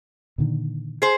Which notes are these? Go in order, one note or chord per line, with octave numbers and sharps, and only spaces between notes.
A#2 D3 D#3
G#4 C5